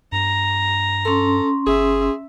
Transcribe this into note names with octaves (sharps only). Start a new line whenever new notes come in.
G2 A#5
C#4 A4 C6
G1 G#4 E5